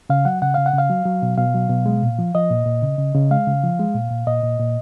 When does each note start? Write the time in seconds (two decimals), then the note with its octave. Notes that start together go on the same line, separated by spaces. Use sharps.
0.10 C#3 F5
0.25 F#3 F#5
0.42 C#3 F#5
0.54 C#3 F5
0.66 F#5
0.74 C#3 F5
0.90 F#3
1.05 F#3
1.22 B2
1.38 B2 F5
1.55 F#3
1.70 B2
1.86 G#3
2.02 A#2
2.19 F3
2.34 F3 D#5
2.50 A#2
2.66 A#2
2.83 C#3
2.98 C#3
3.15 C#3
3.31 G#3 F5
3.47 C#3
3.64 F3
3.80 G#3
3.95 A#2
4.11 A#2
4.27 A#2 D#5
4.43 A#2
4.59 A#2